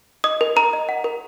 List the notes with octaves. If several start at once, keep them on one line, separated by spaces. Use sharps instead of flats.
D#5 D#6
A#4
A#4 A#5
D#5
F#5
A#4